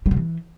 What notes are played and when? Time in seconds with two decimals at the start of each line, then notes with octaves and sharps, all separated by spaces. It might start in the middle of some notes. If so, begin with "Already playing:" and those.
0.06 G3
0.11 C3
0.17 E3